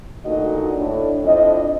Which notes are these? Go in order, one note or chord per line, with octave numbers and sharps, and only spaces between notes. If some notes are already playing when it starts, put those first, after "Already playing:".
D2 A#2 D3 D#4 F#4 D#5
A2 D4
F2 D4 E4 D#5